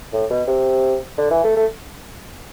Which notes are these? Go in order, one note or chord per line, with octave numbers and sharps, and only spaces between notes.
A2
B2
C3
D3
E3
A3
A3